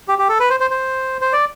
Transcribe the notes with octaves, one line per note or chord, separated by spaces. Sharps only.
G4
G4
A4
B4
C5
C5
C5
C5
D5